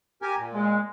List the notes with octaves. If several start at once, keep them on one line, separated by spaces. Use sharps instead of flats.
G4 A#4 G#5
A#2
G#3